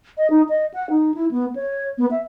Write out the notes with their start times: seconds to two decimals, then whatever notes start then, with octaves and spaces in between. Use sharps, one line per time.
0.17 D#5
0.30 D#4
0.49 D#5
0.74 F#5
0.90 D#4
1.14 E4
1.31 B3
1.56 C#5
1.98 B3
2.11 E5